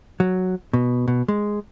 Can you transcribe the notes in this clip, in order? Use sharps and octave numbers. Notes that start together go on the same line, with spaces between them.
F#3
B2
B2
G#3